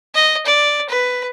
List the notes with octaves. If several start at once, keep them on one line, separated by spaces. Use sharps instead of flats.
D#5
D5
B4